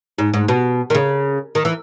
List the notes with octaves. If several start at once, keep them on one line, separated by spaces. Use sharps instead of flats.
G#2
G#2
B2
D#3
C#3
D#3
E3